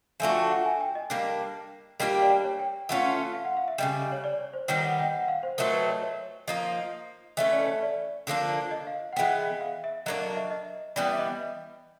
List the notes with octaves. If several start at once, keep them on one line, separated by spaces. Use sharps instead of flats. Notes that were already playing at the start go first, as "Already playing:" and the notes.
F3 A3 D4 F#4 G#5
G5
F#5
G#5
G5
D#5
G3 A#3 D4
G3 A#3 D4 G4 D#5
D5
C#5
G5
E3 A3 C#4 F4 F#5
F5
F#5
F5
E5
C#3 E3 G3 D#5
C#5
D5
C#5
C5
D#3 G3 B3 D#4 C#5
F#5
G5
F#5
F5
C5
F#3 A3 C4 D#4 A#4
B4
C#5
C#5
F3 A#3 D#4 D#5
E3 A3 C#4 D#5
D5
C#5
D5
D3 F3 A#3 D4
D#5
F5
F#5
E3 G#3 B3 G5
F5
E5
F#3 A#3 D4 D#5
D#5
E5
D#5
E3 G3 B3 D5
E5
D#5